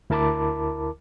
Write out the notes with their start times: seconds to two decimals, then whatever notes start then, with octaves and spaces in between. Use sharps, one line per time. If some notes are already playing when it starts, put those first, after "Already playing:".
0.10 D2 E4 A#4 A5 B5 D6